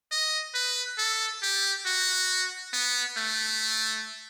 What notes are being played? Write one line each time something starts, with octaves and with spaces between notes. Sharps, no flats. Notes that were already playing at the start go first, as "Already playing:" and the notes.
D#5
B4
A4
G4
F#4
B3
A3